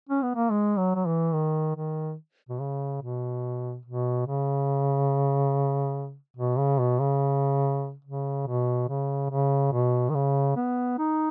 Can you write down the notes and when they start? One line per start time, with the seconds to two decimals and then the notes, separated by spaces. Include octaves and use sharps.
0.09 C#4
0.22 B3
0.36 A#3
0.50 G#3
0.78 F#3
0.95 F#3
1.06 E3
1.33 D#3
1.76 D#3
2.49 B2
2.60 C#3
3.02 B2
3.85 B2
4.27 C#3
6.37 B2
6.58 C#3
6.79 B2
7.00 C#3
8.05 C#3
8.47 B2
8.89 C#3
9.30 C#3
9.73 B2
10.10 D#3
10.15 C#3
10.57 B3
10.99 D#4